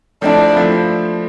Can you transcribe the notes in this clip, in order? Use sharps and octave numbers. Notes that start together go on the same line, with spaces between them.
F3 A3 C4 D4 E4
F3 A3 C4 E4